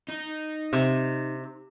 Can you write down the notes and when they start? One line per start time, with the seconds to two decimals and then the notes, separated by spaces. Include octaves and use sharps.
0.08 D#4
0.73 C3